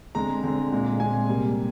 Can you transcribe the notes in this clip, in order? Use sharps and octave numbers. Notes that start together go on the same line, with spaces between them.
D3 G#3 C4 A#5
D3 G#3 C4
A#2 G#3 C4
A#2 G#3 C4 G#5
C3 G3 A#3